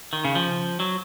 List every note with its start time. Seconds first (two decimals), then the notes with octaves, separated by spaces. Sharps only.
0.13 D#3
0.25 C#3
0.35 F3
0.80 F#3